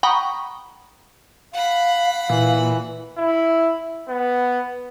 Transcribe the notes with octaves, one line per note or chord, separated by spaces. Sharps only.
F#5 G5 A#5 B5 C#6 D#6
F5 F#5 B5
A#2 E3
E4
B3